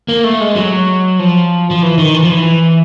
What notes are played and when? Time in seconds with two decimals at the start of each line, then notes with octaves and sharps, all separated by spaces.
0.09 A#3
0.24 A3
0.40 G#3
0.56 F#3
1.19 F3
1.71 F3
1.82 E3
1.98 D#3
2.14 E3
2.23 F3
2.32 E3